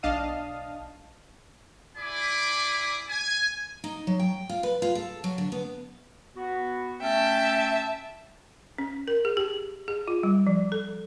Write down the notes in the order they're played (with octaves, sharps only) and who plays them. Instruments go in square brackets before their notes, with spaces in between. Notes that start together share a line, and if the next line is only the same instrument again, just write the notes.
[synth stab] B1 D4 D#5 F5 A5 D#6
[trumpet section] E4 G#4 D5 G#5 B5 D6
G#5
[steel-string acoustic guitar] D#4
F#3
G5
F4
B4
F4
A4
F#3
D3
B3
[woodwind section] B3 F#4
[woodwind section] A3 C#4 [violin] E5 A5 [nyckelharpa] G5
[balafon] C#4
A#4
G#4
G4
G#4
F4
G3
F3
A4